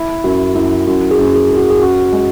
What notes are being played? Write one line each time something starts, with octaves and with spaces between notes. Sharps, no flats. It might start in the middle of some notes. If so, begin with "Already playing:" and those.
Already playing: E4
F#2 F#4
F#2 E4
F#2 F#4
G#4
F#2
G#4
F#2
F#4
G#4
C#4 F#4
G#3